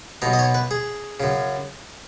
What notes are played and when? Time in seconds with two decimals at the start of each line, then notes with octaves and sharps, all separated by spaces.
0.22 B1 B2 D#4
0.33 D#5
0.39 C#5
0.55 B4
0.71 G#4
1.20 F#2 C#3